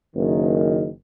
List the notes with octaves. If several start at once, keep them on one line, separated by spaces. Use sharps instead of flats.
F#1 D#3